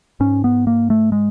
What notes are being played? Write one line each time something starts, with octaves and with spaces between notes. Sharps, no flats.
G#2 C#4
B3
A#3
A3
G#3